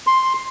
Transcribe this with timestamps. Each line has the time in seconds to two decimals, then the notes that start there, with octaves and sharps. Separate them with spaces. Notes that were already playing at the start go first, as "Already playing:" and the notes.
0.07 C6